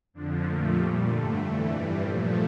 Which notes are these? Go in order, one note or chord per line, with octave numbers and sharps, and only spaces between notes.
F2 D3 F3 D4
A#2 F3 A3 A#4
A#2 G3 G4
G2 D3 A3 F4
F2 E3 A3 E5
G2 E3 G3 D5
A#2 F3 A3 C5